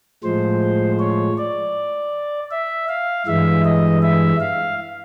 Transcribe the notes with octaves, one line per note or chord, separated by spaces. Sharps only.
A2 F3 G#3 C5
C#5
D5
E5
F5
G2 E3 G#3 E5
D#5
E5
F5